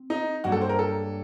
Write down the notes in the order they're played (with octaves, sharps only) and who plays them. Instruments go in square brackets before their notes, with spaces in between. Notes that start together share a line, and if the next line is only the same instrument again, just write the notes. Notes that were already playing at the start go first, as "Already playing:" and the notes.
Already playing: [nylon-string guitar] C4
[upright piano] D#4
[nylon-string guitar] G2 F#3 A#3 [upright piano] F#4
[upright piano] A4
C5
A#4
A4